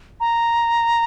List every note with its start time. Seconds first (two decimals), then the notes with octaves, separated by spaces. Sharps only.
0.20 A#5